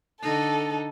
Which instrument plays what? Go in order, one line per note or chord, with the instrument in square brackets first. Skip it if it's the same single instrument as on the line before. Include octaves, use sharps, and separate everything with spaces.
[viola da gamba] D3 D#4 [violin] A4